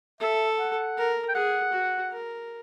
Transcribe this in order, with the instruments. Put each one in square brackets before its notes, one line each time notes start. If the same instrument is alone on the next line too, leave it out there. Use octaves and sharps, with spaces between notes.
[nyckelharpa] A4 [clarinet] E5
[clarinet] F#5
[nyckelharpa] A#4
[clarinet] G5
[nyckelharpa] G#4 [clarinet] F#5
[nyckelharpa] F#4
A#4